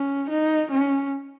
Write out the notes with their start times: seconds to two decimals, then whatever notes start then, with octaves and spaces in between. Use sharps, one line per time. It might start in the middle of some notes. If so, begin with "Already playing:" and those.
Already playing: C#4
0.29 D#4
0.71 C#4